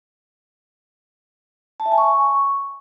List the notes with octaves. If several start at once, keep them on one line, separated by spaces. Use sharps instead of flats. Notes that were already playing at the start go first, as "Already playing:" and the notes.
A5
E5
G#5
C#6